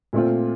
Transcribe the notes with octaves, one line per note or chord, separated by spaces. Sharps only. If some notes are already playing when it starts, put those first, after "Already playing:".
A#2 A3 C4 F4